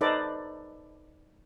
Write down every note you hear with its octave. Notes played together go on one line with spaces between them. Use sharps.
D#4 A4 B4 C5 D5 D#5